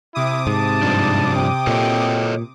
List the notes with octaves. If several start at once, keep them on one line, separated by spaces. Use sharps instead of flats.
C3 E4 D6 D#6
G#2 A5
G2 F3 D4
G5
A#2 A4 C#5 D#5